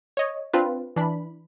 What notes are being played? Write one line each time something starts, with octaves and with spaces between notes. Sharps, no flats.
C#5 D#5
C4 D4 F4 B4
E3 D4 B5